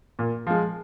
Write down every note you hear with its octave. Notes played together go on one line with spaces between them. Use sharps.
A#2
F3 G#3